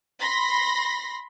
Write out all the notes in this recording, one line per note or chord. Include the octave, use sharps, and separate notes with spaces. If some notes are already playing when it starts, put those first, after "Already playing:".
B5 C6 A#6